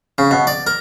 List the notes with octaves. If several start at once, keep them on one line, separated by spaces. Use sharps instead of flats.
C#3
B2
D5
A#4